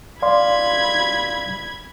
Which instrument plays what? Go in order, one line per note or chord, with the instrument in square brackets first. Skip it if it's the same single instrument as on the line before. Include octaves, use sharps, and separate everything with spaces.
[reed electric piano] D5 F5 C6 [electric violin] B5 G#6